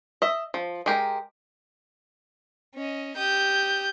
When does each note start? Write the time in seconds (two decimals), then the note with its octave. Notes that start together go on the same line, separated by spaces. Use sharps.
0.22 D#5 E5
0.54 F3
0.86 G#3 G4 A#4
2.75 C#4 D#5
3.17 G4 D#6 G6